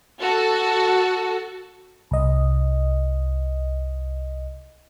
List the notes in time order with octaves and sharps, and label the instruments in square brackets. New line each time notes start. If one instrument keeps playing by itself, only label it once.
[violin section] F#4 A4
[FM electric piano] C2 D#5